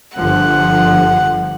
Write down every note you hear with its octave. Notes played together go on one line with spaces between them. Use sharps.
G1 D3 F3 F#5